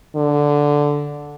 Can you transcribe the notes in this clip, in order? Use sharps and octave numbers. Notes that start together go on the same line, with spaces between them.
D3